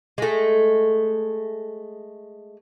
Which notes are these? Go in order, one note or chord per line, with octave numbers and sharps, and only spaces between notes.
G#3 A3